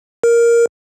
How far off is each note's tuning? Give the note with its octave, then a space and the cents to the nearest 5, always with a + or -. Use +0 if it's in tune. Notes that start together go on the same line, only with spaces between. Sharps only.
A#4 +5